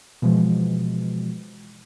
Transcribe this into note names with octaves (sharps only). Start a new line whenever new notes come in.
B2 E3 F3 G#3